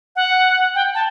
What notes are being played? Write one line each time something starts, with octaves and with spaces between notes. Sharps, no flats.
F#5
G5
A5